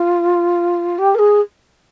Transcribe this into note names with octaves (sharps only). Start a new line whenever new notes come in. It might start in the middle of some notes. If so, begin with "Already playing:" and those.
Already playing: F4
G4
A#4
G#4